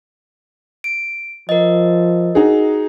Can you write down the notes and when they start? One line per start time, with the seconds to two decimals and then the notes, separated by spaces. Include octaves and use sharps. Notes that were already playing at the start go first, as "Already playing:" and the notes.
0.84 D7
1.49 F3 A#4 D#5
2.35 D#4 F#4 G#4